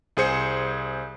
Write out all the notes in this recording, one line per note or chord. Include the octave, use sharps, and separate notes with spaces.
C2 G#4 C5 C#7